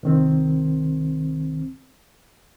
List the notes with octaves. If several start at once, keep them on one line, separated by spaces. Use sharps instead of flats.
C2 D#3 C4